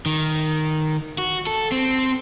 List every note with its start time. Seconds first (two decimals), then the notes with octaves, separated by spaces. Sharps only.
0.06 D#3
1.18 F#4
1.47 A4
1.72 C4